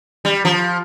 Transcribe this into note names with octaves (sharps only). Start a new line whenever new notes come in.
G3
F3